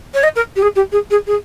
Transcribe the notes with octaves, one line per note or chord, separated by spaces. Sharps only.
C#5
D#5
A#4
G4
G#4
G4
G#4
G#4
G#4